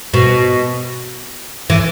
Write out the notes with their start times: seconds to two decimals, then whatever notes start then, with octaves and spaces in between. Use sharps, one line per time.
0.14 B2
1.70 E3